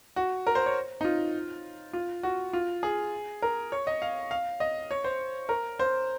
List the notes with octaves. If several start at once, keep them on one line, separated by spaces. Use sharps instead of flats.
F#4
A#4
C5
C#5
D#4
F4
F4
F#4
F4
G#4
A#4
C#5
D#5
F5
F5
D#5
C#5
C5
A#4
C5